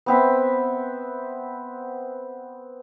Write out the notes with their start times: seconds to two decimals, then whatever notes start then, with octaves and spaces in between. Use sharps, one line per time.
0.06 B3 C4 E5